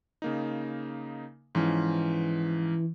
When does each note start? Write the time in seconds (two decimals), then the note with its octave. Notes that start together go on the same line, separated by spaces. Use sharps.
0.22 C#3 A#3 D#4
1.55 G#2 E3 F3 C#4